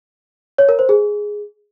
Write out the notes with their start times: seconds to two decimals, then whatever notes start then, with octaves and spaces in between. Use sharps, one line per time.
0.58 C#5
0.69 A#4
0.79 C5
0.89 G#4